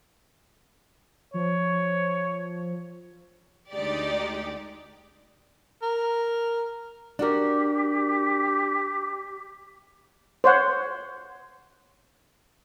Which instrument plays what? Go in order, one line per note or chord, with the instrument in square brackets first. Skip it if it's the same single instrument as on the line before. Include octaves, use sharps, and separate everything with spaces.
[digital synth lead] F3 [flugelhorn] C#5
[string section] D2 G#3 D#4 G4 D5
[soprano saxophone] A#4
[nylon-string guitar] D4 F#4 A#4 [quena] G4
[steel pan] C5 C#5 F#5